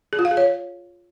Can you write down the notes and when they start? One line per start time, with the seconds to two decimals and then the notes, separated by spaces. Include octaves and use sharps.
0.13 G#4
0.19 F4
0.25 F5
0.31 G#4
0.37 C#5